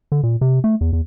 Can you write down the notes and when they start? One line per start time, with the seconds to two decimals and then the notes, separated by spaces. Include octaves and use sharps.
0.12 D3
0.23 A#2
0.41 C3
0.64 A3
0.81 E2
0.93 E2